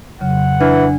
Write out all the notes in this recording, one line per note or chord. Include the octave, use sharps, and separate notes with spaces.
F2 C#3 F#3 F#5
E3 D4 F6